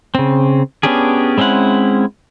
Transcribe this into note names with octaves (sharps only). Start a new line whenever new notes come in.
C#3 C4
B3 C#4 D4 G4 G#4
G#3 C4 C#4 E4 F#5